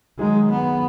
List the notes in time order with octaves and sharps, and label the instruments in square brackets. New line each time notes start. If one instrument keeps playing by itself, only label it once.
[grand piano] D#3 F#3 D#4 G#4 [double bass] G#3
[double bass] B3